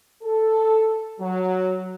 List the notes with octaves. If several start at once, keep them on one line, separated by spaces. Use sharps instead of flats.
A4
F#3